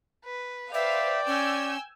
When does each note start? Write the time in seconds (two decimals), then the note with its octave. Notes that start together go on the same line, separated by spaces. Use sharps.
0.25 B4
0.74 B4 C5 D5 E5 F5 G5
1.27 C#4 G#5 E6 G6